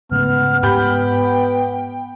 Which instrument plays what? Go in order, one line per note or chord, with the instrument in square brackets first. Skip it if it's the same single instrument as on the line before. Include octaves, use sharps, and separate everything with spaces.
[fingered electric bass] G#2 C#3 A3 [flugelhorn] B3 [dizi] F6
[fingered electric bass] G#2 [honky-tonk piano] G4 B5 G6 [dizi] G5